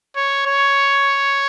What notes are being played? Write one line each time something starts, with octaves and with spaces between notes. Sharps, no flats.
C#5
C#5